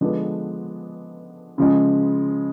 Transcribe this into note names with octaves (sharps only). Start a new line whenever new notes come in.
D3 F3 G#3 B3 D4
C#3 F3 G#3